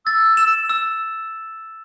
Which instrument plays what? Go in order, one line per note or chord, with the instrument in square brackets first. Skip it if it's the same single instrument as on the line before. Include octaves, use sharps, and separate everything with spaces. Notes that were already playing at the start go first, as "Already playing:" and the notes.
[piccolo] E6 [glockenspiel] A6
[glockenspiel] E7
E6